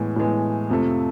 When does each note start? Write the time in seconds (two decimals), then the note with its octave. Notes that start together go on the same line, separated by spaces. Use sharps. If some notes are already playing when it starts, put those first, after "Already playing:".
Already playing: A2 E3 G#3 B3
0.16 A2 E3 G#3 B3
0.70 F2 C3 F3 A3